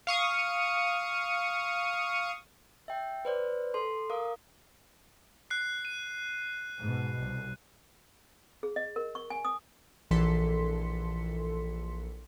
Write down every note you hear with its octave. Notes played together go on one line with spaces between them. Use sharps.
F5 C#6 D#6
E5 G5
B4 C5 D5
A4 C6
A#4 F5 D6 D#6
F#6 C7
D#7
G#2 B2
C2
G#4
D#5
A#4
C#6
G#5
D#6
A#1 E3 A4 C6 B6 C#7